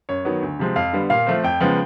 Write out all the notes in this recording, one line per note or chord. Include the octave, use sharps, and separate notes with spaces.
F#2 C#5
D#3 F#3 B3
D2
C3 F3 G#3 C4
F2 F5
D3 G3 B3
A#2 F5
F3 A3 C4
F2 G5
C#3 F3 G#3 B3